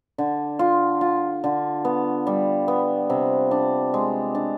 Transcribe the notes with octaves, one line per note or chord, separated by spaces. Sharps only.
D3
F4
F4
D3
B3
G3
B3
C3
D4
G#3
D4